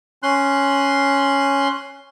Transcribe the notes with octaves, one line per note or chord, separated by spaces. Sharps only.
C#4 C6 F#6